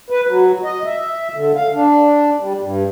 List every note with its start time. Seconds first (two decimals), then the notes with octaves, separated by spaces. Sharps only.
0.10 B4
0.27 F#3
0.64 D#5
0.85 E5
1.34 D3
1.56 F5
1.74 D4
2.40 G3
2.62 G2